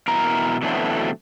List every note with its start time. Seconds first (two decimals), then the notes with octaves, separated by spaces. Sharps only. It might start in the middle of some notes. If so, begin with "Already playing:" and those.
0.08 B2 E3 E4 A#4 A#5
0.62 B2 D3 E3 F#3 A3 C4